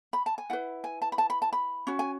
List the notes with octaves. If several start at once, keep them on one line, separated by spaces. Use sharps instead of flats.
B5
A5
G#5
E4 B4 F#5
G#5
A5
B5
A5
B5
A5
B5
C#4 F#4
G#5